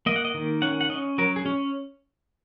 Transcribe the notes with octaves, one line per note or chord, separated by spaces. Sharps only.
A#3 D#5
F#5
D#5
D#3
C#4 F#5
F#5
C#4 D#5
F#3 A#4
G#4
C#4